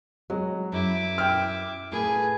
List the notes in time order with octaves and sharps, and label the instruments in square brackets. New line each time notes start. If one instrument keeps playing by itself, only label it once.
[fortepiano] F#3 [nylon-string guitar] G#3
[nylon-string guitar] F#2 [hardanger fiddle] E4 D6
[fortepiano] G5 F6
[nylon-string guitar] A2 B4 [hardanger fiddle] G#4